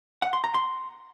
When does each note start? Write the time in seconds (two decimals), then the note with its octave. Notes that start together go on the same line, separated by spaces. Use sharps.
0.22 F#5
0.33 C6
0.44 A#5
0.54 C6